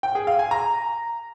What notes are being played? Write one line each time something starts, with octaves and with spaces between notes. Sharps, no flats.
G5
G#4
F5
G#5
A#5